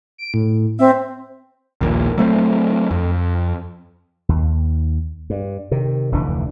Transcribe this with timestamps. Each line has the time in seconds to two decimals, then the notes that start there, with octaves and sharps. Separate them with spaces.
0.18 D7
0.34 A2
0.79 C4 E5
1.81 A#1 D#2 A#2
2.18 F#3 A3 C4
2.91 F2
4.29 D#2
5.30 G2
5.71 C3 D#3
6.12 F1 D2 E3 D4